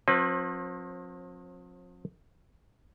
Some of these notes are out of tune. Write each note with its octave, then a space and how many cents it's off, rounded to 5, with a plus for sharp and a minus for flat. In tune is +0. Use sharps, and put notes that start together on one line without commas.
F3 +45 C4 +35 B4 +0